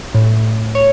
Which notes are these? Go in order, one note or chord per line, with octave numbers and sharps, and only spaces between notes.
A2
C#5